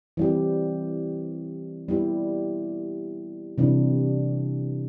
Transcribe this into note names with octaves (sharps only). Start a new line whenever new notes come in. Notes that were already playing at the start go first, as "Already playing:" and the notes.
E3 G3 C4 G4
G3 B3 E4 G4
C3 E3 G3 D4